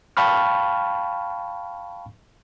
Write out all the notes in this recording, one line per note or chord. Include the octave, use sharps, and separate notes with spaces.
F5 G5 A5 B5 C#6 F6